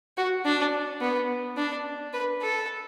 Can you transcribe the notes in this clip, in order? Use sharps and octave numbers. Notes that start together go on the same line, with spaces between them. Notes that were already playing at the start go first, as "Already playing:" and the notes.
F#4
D4
B3
D4
B4
A4